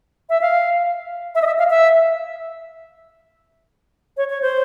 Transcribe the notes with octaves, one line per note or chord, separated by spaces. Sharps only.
E5
F5
E5
D#5
E5
F5
E5
C#5
C#5
C5